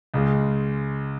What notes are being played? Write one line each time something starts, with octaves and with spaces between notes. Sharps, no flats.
C#2 C#3 G#3